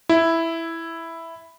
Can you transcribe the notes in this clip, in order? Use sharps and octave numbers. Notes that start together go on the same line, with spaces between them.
E4